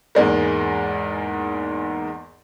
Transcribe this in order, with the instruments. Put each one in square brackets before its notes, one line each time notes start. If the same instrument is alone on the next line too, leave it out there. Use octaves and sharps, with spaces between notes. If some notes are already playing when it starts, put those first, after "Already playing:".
[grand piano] E2 G#2 G#3 A#3